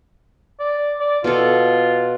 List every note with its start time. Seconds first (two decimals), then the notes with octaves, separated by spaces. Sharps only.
0.60 D5
1.01 D5
1.24 B2 F4 A4